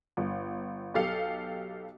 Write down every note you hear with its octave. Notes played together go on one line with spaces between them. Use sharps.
G1
B1 G4 A4 F5